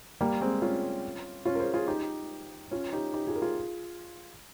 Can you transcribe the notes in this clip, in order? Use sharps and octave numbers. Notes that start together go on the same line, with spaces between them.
G3 A#3
G#3 C4
C#4 F4
C#4 F4
A#4
G#4 C5
F4 G#4
D#4 G4
C#4 F4
D#4 G4
D#4 G4
F4 G#4
A#4
F4 G#4